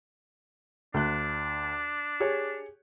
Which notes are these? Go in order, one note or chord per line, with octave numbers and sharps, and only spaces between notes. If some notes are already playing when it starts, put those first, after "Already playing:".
D2 D4 F#6
G4 G#4 C#5